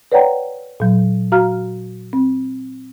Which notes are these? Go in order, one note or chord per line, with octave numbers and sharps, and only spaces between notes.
B4 C#5 D5 F#5 G5 A#5
A#2 F#3
F#4 F5 A#5 F6
C4